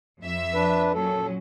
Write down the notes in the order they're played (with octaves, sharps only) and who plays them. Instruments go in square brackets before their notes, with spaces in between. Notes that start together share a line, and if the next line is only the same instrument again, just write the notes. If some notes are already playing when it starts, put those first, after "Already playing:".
[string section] F2 E5
[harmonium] D4 B4
[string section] A#2 F#3 C#4 [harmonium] A4